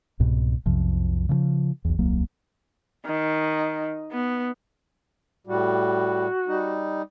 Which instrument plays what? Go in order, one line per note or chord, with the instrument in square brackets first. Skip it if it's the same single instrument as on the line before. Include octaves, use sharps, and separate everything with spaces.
[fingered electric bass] C2 G#2 B2
B1 F2 C3 F3
C#3 E3 F3
B1 E2
D#1 C2 F#3 A#3
[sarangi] D#3
B3
[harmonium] A2 G3 [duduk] F#4
[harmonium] G3 D#4